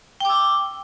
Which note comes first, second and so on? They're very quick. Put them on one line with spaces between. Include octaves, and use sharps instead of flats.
G5 D6 E6